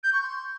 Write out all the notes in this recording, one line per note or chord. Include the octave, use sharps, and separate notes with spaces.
G6
C#6
C6